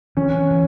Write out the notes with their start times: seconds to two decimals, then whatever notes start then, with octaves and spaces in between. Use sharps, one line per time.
0.17 E3 C#4
0.51 E3